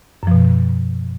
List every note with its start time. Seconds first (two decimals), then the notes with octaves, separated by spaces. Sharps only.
0.23 F#2
0.27 F3
0.31 B2